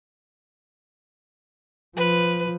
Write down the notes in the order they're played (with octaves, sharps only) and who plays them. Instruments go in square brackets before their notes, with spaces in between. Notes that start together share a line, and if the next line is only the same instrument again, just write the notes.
[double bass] F3 [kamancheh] B4